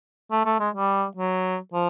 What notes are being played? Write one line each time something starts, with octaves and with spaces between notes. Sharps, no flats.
A3
A3
G#3
G3
F#3
F3